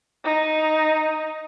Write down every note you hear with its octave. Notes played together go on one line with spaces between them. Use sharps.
D#4